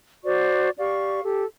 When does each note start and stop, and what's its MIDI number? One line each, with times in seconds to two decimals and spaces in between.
0.24 0.69 66
0.24 0.69 72
0.24 0.69 74
0.24 0.69 85
0.78 1.22 67
0.78 1.22 74
0.78 1.22 77
0.78 1.22 85
1.24 1.45 67
1.24 1.45 69